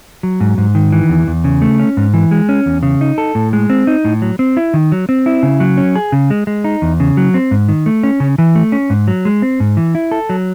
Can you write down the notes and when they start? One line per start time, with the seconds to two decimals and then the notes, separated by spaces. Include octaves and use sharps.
0.23 F#3
0.40 G#2
0.58 G#2
0.75 D#3
0.92 E3
1.09 E2
1.27 E2
1.44 C#3
1.62 A3
1.80 C#4
1.97 G#2
2.14 E3
2.31 G#3
2.49 C#4
2.66 E2
2.83 C#3
3.01 D#4
3.18 A4
3.35 A2
3.53 G#3
3.70 C4
3.87 D#4
4.05 A2
4.22 F#3
4.39 C4
4.57 E4
4.74 D#3
4.92 F#3
5.09 C4
5.26 E4
5.43 C#3
5.60 F#3
5.77 C#4
5.96 G#4
6.12 C#3
6.30 G#3
6.47 G#3
6.64 D#4
6.82 E2
7.00 C#3
7.17 F#3
7.34 C4
7.51 G#2
7.69 D#3
7.86 A3
8.03 C#4
8.20 C#3
8.38 E3
8.55 A3
8.72 C#4
8.90 G#2
9.08 F#3
9.25 G#3
9.42 C4
9.60 G#2
9.77 E3
9.95 E4
10.12 A4
10.30 F#3